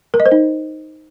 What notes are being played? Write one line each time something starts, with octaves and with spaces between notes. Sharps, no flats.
A#4
D#5
C5
D#4